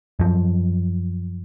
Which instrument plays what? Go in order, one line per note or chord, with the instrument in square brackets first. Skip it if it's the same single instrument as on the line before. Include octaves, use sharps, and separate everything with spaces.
[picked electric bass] F#2 F3